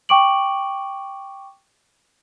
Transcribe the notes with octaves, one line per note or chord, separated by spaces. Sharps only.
G5 C#6 D6 D7 F#7